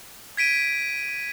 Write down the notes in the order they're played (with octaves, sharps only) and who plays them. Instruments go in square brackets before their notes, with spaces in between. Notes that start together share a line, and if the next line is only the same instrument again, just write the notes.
[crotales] G#6 B6 D7 D#7